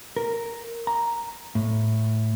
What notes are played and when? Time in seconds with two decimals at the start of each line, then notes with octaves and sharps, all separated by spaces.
0.17 A#4
0.87 A#5
1.55 A2